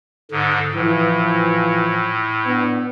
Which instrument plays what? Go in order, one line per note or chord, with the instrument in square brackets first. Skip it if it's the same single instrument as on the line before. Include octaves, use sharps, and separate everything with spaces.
[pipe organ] G#2 D3
[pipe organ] A2 [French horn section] E3 F3
[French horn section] B3 D4